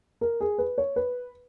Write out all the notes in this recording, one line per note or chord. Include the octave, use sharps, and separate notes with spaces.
A#4
G#4
B4
C#5
B4